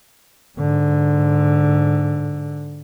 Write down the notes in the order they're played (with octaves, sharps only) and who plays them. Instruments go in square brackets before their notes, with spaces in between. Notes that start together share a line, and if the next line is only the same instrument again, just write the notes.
[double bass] G#2 D3